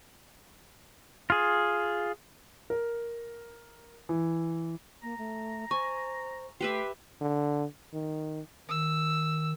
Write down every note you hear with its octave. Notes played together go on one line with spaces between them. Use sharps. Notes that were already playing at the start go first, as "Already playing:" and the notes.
F4 G#4
A#4
E3
A#3 A#5
A3
C5 G#5 C#6
A3 G4 B4 E5 C6
D3
D#3
D#3 E6